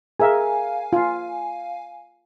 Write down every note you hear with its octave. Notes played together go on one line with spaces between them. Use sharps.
G#4 A#4 E5 F5 G#5
F4